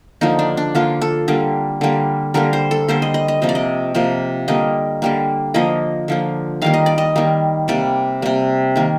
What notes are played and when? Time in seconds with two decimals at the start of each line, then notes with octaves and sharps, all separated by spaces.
0.21 D3 F3 A#3 D#4
0.39 D4
0.57 D4
0.75 D3 F3 A#3 F4
1.02 A4
1.28 D3 G3 A#3
1.81 D3 G3 A#3
2.34 D3 G3 A#3 A#4
2.53 C5
2.71 A4
2.88 D3 G3 A#3 C5
3.02 D#5
3.14 D#5
3.28 D#5
3.42 C3 F3 A#3 D#5
3.49 D5
3.55 D#5
3.95 C3 F3 A#3
4.48 D3 G3 A#3 D#5
5.02 D3 G3 A#3
5.54 D3 F3 A#3 D#5
6.08 D3 F3 A#3
6.62 D#3 G3 A#3 F5
6.74 D#5
6.86 D5
6.98 D#5
7.16 D#3 G3 A#3
7.68 C3 G3 A#3 D5
8.22 C3 G3 A#3
8.76 D#3 A#3